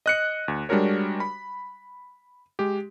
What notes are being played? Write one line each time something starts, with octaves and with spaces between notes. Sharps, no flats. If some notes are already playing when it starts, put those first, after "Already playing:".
D#5 F#6 C#7
D2
G3 G#3 D4 F#4 A#4 C#5
B5
G#3 G4